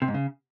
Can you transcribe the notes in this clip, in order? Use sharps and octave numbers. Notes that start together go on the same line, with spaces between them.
C3
G#2
C#3